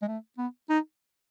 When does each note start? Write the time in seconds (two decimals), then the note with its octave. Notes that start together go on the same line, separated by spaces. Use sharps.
0.02 G#3
0.08 A3
0.38 B3
0.69 D#4